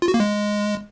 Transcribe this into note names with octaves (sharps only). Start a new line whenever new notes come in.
F4
F#4
A#3
G#3